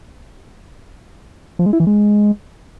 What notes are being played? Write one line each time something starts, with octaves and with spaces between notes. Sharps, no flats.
F3
G#3
E4
E3
G#3